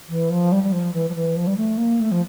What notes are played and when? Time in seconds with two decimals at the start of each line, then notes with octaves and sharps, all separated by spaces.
0.09 E3
0.30 F3
0.52 G3
0.63 G3
0.72 F3
0.93 E3
1.09 F3
1.15 E3
1.36 F3
1.47 G3
1.57 A3
1.77 A#3
2.00 A3
2.11 F3